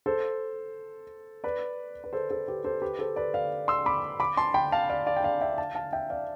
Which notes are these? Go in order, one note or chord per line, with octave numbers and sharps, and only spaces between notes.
A4 C5
B4 D5
B4
A4 C5
A4 C5
G4 B4
A4 C5
G4 B4
A4 C5
B4 D5
D5 F5
C6 E6
B5 D6
B5 D6
A5 C6
G5 B5
F5 A5
D5 F5
D5 F5
G5
D5 F5
E5 G5
F5 A5
F5 A5
E5 G5
D5 F5